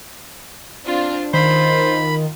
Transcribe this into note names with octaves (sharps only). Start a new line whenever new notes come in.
C4 D4 F4
D#3 F4 C5 B5